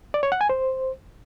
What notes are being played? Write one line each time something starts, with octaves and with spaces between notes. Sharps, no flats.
D5
C#5
F#5
G#5
C5